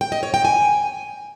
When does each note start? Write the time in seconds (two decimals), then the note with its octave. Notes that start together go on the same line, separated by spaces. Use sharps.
0.01 G5
0.12 D#5
0.23 C#5
0.34 G5
0.45 G#5